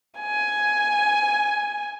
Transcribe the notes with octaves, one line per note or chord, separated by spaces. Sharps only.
G#5